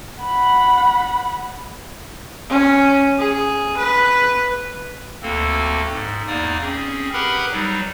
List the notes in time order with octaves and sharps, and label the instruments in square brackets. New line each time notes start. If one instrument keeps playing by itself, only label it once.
[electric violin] F#5 B5
[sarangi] C#4
G#4
B4
[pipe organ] D2 A#3 C4 A4
G#2
E2 A#3 D#4 D5 D#6
C4 C#4 G#4
G4 G#4 A#4 B4 F#5 B5
F#3 G3 D#4